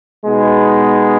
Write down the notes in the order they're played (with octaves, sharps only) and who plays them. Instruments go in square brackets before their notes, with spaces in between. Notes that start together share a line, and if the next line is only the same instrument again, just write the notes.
[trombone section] B2 G#3 B3 D#4